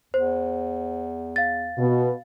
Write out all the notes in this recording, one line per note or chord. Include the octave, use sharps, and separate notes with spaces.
E2 C5
F5 A6
B2